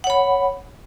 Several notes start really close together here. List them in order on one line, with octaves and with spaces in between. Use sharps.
F#5 C#5 B5